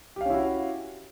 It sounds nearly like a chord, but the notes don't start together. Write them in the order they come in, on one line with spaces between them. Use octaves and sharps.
G4 F5 C#4 E4 F#4